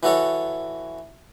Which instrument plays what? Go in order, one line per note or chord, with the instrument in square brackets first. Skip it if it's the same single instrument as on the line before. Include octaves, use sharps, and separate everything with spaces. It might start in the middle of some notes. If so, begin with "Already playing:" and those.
[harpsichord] E3 F#4 A4 C#5